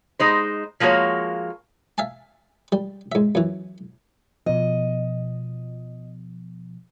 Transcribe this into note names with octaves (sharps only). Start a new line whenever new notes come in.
G#3 D#4 C5
F3 G#3 A#3 F#4 C#5
E5 F5 G#5 A5
G3
G#2 E5
F#2 E3
B2 F3 D#5